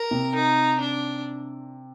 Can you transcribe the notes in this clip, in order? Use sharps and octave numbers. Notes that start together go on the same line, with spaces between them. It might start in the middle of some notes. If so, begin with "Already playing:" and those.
Already playing: A#4
C3
D#4
D4